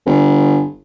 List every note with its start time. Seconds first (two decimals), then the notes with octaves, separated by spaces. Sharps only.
0.06 G1